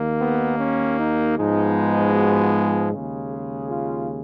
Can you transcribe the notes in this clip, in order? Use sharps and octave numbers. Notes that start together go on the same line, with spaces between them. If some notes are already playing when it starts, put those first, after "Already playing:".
Already playing: D#2 D#3 A#3
B3
C#4
D#4
G#2 F3 G#3 B3 D#4
F#4
G#4
D#2 C#3 G#3
G#4
F4